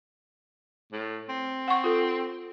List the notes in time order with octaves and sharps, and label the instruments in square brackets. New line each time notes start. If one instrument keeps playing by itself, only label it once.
[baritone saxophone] A2
C4
[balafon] F#5 C#6
F4 A4